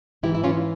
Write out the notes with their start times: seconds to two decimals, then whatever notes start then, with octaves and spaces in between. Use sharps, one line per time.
0.23 G#2 E3 E4 G4
0.35 E4
0.44 C#4 F4